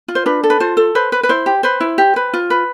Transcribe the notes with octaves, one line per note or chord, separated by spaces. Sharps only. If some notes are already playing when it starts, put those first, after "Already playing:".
F4
C5
D4 B4
A4
B4
F4 C5
A4
B4 C5
B4
B4
E4 C5
G4
B4 C5
E4
G4
B4
F4
B4